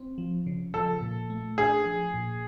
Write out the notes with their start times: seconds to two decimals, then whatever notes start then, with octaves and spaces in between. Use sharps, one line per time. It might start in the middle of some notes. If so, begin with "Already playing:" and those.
Already playing: C4
0.18 F3
0.46 C#3
0.74 F3 A4
1.01 A#2
1.30 A3
1.58 D4 G#4
1.86 F3
2.14 A#2